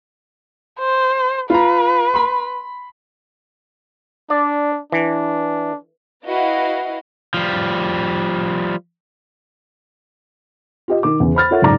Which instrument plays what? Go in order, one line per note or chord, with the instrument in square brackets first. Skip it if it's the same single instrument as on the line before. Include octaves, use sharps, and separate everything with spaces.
[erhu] C5
[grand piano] F4 A#5 [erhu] B4
[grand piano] B5 C6
[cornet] D4 [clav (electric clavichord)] D5
[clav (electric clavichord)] E3 [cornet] D4
[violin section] E4 F#4 B4 D#5 F5
[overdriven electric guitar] F3 G3
[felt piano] F4 G4 D#5
D#3 A#4 D6
E2 C#3
C5 B5 F6 A6
F4 A4 A#4 C#5 E5 F#5
F#1 G#2 D5 A#5 D6